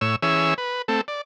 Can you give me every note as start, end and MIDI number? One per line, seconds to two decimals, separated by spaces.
0.01 0.16 45
0.01 0.16 73
0.01 0.16 88
0.23 0.54 52
0.23 0.54 61
0.23 0.54 68
0.23 0.54 73
0.23 0.54 76
0.23 0.54 88
0.58 0.82 71
0.88 1.01 57
0.88 1.01 60
0.88 1.01 69
1.08 1.21 74